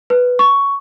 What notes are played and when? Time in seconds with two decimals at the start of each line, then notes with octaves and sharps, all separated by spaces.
0.10 B4
0.39 C#6